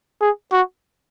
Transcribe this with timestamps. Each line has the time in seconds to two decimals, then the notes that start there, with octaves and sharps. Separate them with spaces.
0.21 G#4
0.52 F#4